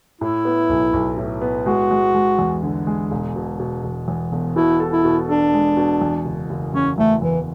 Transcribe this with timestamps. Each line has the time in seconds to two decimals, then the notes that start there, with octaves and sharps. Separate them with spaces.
0.21 A2 E4
0.45 B3
0.69 B1
0.93 B1
1.18 A2
1.42 B3
1.66 G#3 F#4
1.91 G#3
2.14 G#3
2.39 E2
2.63 D3
2.87 G#3
3.11 E1
3.36 B2
3.60 B2
3.84 E1
4.08 E2
4.32 E1
4.56 B2 E4
4.80 A4
4.93 E4
5.05 B2
5.29 D4 A4
5.54 G#3
5.77 B2
6.01 E2
6.25 F#1
6.50 F#1
6.74 E2 C#4
6.98 E2 A3
7.22 E2 E3